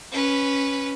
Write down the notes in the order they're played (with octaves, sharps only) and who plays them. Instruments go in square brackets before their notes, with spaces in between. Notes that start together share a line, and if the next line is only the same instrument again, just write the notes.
[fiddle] C#4 B4